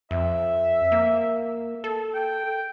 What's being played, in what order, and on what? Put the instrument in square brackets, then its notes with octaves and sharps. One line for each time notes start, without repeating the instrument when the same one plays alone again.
[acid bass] F2 [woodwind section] E5
[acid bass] A#3
A4
[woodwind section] G5